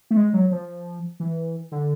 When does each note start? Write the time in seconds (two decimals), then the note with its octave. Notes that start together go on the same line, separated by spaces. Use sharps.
0.11 A3
0.17 G#3
0.33 F#3
0.51 F3
1.20 E3
1.72 D3